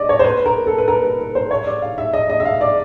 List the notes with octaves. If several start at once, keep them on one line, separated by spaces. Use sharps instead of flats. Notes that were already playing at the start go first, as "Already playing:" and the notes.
Already playing: D5 D#5
C#5
C5
B4
A#4
A4
B4
A#4
B4
B4
C5
C#5
D5
F5
E5
D#5
D#5
E5
F5
D5